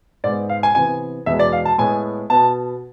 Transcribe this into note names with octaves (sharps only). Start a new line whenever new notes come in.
G#2 G#3 B3 D5
F5
G#5
C3 E3 B3 G#5
E2 B2 G#3 B3 E5
D5
F5
A5
A2 G#3 B3 G#5
B2 B3 A5